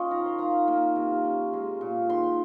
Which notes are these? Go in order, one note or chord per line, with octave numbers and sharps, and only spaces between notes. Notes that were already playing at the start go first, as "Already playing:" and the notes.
Already playing: C#4 F4 C#5 D#5
D#3 A#5
C6
F4 A#5
A#3
C3
C#4
G#3
A#2
D#3 C6